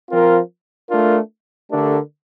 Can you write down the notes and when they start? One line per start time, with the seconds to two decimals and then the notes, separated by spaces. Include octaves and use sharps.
0.11 F3 C4 F4 A#4
0.90 A3 D4 F4 A#4
1.71 D3 A3 D4 G4 A#4